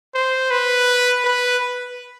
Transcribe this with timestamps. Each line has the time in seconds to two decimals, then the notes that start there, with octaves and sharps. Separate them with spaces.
0.15 C5
0.51 B4
1.24 B4